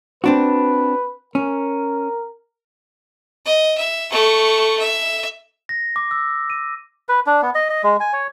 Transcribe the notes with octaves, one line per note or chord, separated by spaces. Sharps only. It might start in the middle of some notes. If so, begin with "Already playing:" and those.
C4 D4 F#4 B4
C#4 A#4
D#5
E5
A3 C#6
E5
A#6
D6
E6
D#7
B4
D4
B3
D#5
D#5
G#3
G#5
C#5